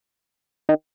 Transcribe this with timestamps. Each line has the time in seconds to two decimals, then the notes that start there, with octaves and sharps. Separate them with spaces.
0.69 D#3